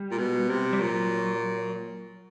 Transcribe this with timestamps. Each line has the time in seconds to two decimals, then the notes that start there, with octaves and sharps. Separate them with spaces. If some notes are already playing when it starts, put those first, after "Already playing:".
Already playing: G3
0.11 A#2
0.19 B2
0.50 C3
0.73 G3
0.80 A#2 F#3